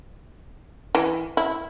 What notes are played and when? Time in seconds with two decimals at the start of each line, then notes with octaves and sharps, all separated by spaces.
0.95 E3
1.37 E4